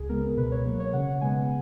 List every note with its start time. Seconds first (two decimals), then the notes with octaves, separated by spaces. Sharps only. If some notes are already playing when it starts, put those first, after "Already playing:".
Already playing: C#2 G#4
0.09 C#3 G#3 B3 A#4
0.37 B2 B4
0.52 C#5
0.65 F#3 A#3
0.80 C#5
0.93 C#3 F#5
1.21 G#3 B3 G#5